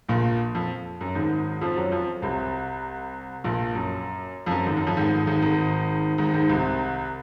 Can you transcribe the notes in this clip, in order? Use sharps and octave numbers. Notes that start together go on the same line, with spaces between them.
A#1 A#2
F2
F#2
G#1 G#2
F2 F3
F#2 F#3
F2 F3
C2 C3
A#1 A#2
F#2
F2
F#2
G#1 G#2
F#2
F2
G#1 G#2
G#1 G#2
G#1 G#2
G#1 G#2
G#1 G#2
C2 C3